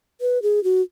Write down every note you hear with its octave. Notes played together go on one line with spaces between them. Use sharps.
B4
G#4
F#4